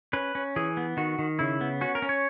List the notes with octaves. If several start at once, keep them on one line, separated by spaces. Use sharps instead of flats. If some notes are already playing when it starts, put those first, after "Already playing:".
C#4 B4
C#4
E3 G#4
B3
D#3 F#4
D#3
C#3 E4
B3
C#4 F#4
A#4
C#4
C#5